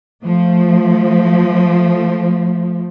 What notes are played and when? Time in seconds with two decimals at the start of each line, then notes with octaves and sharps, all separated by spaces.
0.24 F3 A3